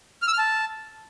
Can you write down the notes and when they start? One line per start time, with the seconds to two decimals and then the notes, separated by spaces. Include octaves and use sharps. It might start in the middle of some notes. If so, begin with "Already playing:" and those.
0.22 F6
0.28 E6
0.33 F6
0.38 A5